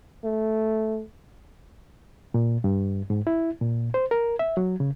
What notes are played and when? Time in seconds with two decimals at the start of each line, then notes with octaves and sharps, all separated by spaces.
0.24 A3
2.34 A#2
2.64 G2
3.10 G#2
3.27 E4
3.61 A#2
3.94 C5
4.11 A#4
4.39 E5
4.57 F#3
4.80 C#3